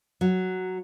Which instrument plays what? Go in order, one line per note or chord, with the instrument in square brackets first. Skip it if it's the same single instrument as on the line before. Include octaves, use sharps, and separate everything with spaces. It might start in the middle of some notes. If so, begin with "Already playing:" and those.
[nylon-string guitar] F#3